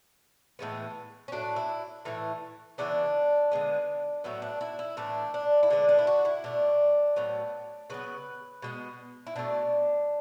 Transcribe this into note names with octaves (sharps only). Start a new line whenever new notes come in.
A2 E3 G#3 B3
C#4
A2 F#3 A3 D4
E4
A2 E3 A3
C#3 E3 B3 D4
D3 G#3 B3
A2 F#3 B3 E4
D4
E4
E4
A2 E3 A3 D4
D4
E4
D3 G#3 B3 D4
D4
E4
F#4
E4
B2 A3 D4
A2 F#3 B3
C#3 F#3 B3 B4
B2 G#3 B3
E4
B2 A3 D4